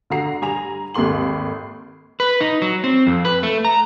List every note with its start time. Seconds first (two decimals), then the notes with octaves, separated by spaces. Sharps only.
0.10 D3 F#4 A#5 C7
0.41 G2 G#5 A#5 F7
0.94 G#1 D#2 A4 C6 F#7
2.20 B4
2.41 D#4
2.62 F#3
2.84 C4
3.07 F2
3.25 B4
3.43 A3
3.65 A#5